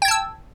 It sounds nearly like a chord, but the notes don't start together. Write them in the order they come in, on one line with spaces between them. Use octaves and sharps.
G5 G#6 A5 E6